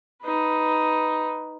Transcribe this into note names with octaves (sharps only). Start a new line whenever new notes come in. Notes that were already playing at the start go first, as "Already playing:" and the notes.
D#4 B4